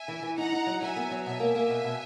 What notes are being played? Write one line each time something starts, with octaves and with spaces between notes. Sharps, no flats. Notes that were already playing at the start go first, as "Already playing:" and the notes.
Already playing: E5 G#5
E3
E3
D#4 F#5 A#5
D#4
F#3
F#3 E5 G#5
B3
F#3
B2 E5 G#5
A#3
A#3
B2
B2